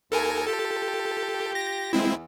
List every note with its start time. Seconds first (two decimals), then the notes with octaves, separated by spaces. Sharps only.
0.12 D#2 A4 A#4 G#5
0.48 F4 G4 A4
1.55 A#6
1.93 E2 G#3 C4 E4